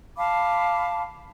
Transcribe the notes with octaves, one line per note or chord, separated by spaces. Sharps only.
F5 A5 B5 D6